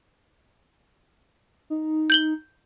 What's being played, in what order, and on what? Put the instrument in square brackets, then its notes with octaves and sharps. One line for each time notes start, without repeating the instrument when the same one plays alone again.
[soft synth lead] D#4
[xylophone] G6 F#7 G7